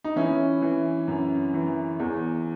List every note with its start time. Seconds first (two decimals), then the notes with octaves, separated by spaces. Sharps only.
0.04 D#4
0.16 E3 C#4 E4
0.62 E3
1.08 F#2
1.54 E3
2.00 E2